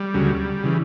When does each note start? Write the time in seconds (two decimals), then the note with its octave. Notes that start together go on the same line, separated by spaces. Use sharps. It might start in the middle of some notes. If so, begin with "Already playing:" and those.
Already playing: G3
0.14 D2 C#3 F#3
0.63 C#3 E3